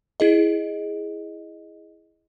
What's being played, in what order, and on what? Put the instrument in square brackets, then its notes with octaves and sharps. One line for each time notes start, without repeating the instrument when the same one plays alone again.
[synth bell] E4 G#4 D#5